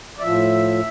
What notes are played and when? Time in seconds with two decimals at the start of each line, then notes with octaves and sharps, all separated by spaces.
0.18 D5
0.22 A2 F3 E5